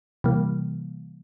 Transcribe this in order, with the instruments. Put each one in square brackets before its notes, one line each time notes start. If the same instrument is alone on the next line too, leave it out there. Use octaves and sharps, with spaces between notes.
[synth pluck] C3 E3 G3 A#3